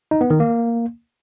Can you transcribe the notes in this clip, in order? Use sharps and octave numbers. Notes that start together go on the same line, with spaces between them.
D#4
B3
D#3
A#3